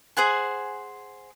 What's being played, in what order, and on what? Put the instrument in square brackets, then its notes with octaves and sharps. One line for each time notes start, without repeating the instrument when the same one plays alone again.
[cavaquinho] G#4 C5 F#5 G#5